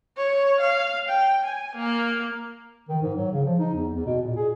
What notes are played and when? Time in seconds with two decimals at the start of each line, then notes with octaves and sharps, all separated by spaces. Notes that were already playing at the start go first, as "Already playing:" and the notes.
0.17 C#5
0.60 F5
1.08 G5
1.44 G#5
1.76 A#3
2.89 D#3
3.02 G#2
3.15 F#3
3.32 C#3
3.45 F3
3.59 D#4
3.75 E2
3.94 E2
4.06 B2
4.22 A#2
4.36 G#4